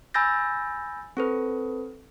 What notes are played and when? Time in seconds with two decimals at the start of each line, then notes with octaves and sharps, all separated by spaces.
0.14 G#5 B5 E6 G6 A6 A#6
1.17 C4 A4 B4